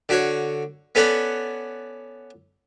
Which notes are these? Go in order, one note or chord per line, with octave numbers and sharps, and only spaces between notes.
D3 F#4 C#5
B3 C#4 A4 C#5 D5 F#5